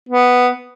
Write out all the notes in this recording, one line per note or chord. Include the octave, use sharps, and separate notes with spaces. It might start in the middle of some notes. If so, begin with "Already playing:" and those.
B3